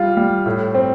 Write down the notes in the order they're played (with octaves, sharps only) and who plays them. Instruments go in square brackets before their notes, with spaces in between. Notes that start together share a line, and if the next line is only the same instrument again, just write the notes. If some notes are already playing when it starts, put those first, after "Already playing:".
Already playing: [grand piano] G3 F4
G3
A2
C4